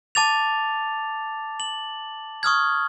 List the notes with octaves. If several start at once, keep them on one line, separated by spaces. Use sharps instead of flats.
A5 D6 A6 F7
F#7
C#6 D#6 F6 G#6